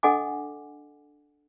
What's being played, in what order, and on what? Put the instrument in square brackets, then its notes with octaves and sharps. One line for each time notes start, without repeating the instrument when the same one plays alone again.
[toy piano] D4 A4 D#5 F#5 G#5 D6